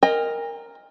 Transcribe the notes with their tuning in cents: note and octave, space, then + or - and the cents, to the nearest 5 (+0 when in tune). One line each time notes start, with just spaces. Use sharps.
A#4 +0 D#5 +0 G5 +45